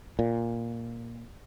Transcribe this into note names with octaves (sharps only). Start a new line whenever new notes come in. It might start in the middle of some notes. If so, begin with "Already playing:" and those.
A#2